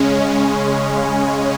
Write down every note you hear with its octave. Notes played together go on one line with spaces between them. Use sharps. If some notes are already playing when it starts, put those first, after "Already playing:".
Already playing: C#3 G#3 C#4